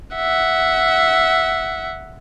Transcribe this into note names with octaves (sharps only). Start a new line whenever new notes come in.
E5 F#5